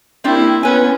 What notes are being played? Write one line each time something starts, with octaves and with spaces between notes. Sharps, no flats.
A#3 C4 D4 E4 G4
B3 C#4 B4 G#5